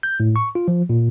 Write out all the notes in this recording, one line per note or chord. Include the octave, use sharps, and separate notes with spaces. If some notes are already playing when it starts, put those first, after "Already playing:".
G6
A2
C#6
F4
F3
A#2